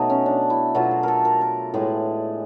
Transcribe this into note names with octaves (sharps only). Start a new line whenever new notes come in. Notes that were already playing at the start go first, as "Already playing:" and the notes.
Already playing: B2 F#3 A3 D#4
C#4
D4
E4
B2 F#3 A3 F4
G#4
A4 A#4
A#4
A#4
A2 E3 G#3 G#4